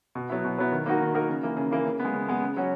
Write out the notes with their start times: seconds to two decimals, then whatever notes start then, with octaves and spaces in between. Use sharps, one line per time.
0.15 B2
0.30 F#3 B3 E4
0.45 B2
0.58 F#3 B3 E4
0.72 D#3
0.86 A#3 D#4 F#4 A#4
1.01 D#3
1.14 A#3 D#4 F#4 A#4
1.28 C#3
1.43 E3 A#3
1.57 C#3
1.71 E3 A#3
1.85 C#3
2.00 G#3 B3
2.14 C#3
2.28 G#3 B3
2.42 C#3
2.57 F#3 C#4 F#4